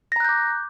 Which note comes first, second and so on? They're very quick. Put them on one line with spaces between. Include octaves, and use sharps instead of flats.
A#6 A#5 F#6 G6 D6